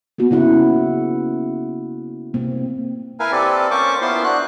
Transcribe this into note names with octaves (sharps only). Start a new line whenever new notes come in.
A#3 B3 F#4
C#3 E4 F#5
C3 A#3 C4
E4 A#4 B4 F5 G#5
C4 G4 A4 B4 D5
A#3 C#4 C5 C#6 D6
A#3 B3 E4 F4 C5 C6
D4 F#4 F#6